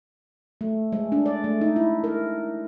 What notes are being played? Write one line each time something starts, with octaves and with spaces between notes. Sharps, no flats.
A3
G#3
D4
D5
A3
D#4
E4
A#4